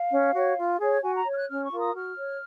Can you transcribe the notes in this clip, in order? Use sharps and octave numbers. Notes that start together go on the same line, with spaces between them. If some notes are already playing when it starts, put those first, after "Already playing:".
Already playing: F5
C#4
F#4 C#5
F4
G#4 C#5
F#4 G#5
A#5
C#5
F6
F#6
C#4 F6
C#6
F4 A#4
D#6
F#4 F6
C#5